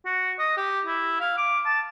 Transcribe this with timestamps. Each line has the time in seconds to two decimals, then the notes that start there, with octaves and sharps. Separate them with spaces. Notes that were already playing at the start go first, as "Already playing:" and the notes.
0.06 F#4
0.39 D#5
0.57 G4
0.86 E4
1.20 F5
1.37 D6
1.65 A5